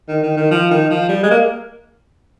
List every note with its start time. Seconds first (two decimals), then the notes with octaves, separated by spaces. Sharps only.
0.08 D#3
0.23 D#3
0.37 D#3
0.51 F3
0.71 D#3
0.90 F3
1.09 G3
1.23 G#3
1.31 A#3